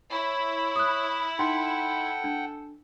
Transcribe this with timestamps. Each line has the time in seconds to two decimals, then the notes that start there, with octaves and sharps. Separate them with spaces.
0.11 E4 C#5
0.76 D#6 F#6
1.39 D#4 A4 F#5 G5 C6
2.24 D4